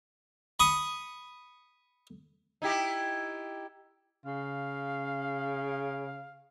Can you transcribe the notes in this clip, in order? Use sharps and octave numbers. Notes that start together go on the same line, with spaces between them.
B5 C#6 D#6
D#4 E4 G4
C#3 F5